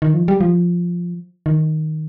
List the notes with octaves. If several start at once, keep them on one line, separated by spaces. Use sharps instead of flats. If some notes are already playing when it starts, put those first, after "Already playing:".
D#3
F3
G3
F3
D#3